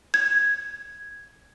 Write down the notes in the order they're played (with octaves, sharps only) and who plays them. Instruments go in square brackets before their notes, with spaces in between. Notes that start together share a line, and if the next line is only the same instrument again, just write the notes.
[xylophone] G#6